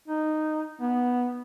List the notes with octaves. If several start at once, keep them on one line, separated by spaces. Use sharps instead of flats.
D#4
B3